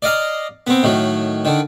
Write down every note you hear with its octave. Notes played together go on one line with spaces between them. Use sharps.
D5 D#5 F5 A#5
B3 C4
A2 D#3 F#3
D3 D#3